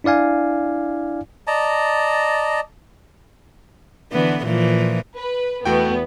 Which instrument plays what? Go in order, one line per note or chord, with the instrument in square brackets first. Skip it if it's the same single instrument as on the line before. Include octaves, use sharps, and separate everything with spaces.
[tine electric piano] D4 E4 D5 F5 G#5
[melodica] D5 D#5 A5 A#5
[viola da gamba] D3 E3 B3
A#2 E3 F3
[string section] B4
[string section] E2 B3 [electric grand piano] A3 F#4 G5